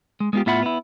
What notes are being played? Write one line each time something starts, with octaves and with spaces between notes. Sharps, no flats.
G#3
G#3 B3 D4 F4 G4
A2 B3 F4 E5 F#5 B5
B3 E4